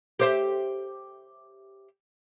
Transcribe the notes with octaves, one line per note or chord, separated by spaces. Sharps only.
G4 C5 E5